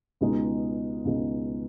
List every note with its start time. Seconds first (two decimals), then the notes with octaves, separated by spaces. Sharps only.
0.21 C#2 B2 G#3 D#4
1.05 C#2 B2 G#3 D#4